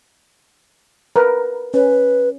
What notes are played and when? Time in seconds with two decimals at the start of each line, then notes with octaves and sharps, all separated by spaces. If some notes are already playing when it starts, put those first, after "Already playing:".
1.16 A#4 B4
1.74 C#4 B4